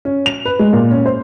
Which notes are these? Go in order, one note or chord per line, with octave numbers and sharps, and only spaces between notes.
C#4
F7
B4
G#3
A#2
C#4
C5